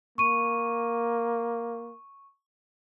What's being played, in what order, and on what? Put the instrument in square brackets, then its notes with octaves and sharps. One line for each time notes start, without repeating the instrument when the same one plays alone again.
[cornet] A#3 [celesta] C#6 D#7